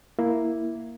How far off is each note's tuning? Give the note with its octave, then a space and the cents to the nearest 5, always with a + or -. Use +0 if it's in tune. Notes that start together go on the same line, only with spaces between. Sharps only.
A#3 +0 E4 +0